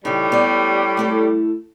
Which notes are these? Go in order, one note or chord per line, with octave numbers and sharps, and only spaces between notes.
A2 C#3 G3 D#4
B3 G4 D5
A3 E4 A4